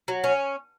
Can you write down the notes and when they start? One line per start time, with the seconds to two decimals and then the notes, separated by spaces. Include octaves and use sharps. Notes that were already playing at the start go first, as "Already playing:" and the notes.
0.08 F#3
0.24 C#4